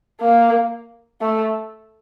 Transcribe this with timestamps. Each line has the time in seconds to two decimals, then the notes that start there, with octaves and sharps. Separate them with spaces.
0.21 A#3
1.21 A3